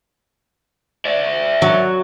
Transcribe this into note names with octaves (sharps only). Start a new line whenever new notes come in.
D5 E5
F#3